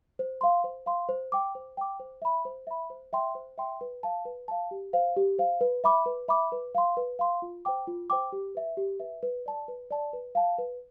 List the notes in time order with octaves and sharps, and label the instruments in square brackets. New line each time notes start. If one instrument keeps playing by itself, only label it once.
[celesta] C5
F5 C6
C5
F5 C6
C5
G5 D6
C5
G5 D6
C5
E5 B5
C5
E5 B5
C5
E5 G5 C6
C5
E5 G5 C6
B4
F5 A5
B4
F5 A5
G4
C5 F5
G4
C5 F5
B4
E5 B5 D6
B4
E5 B5 D6
B4
F5 C6
B4
F5 C6
F4
C5 G5 D6
F4
C5 G5 D6
G4
B4 E5
G4
B4 E5
B4
D5 A5
B4
D5 A5
B4
F5 A5
B4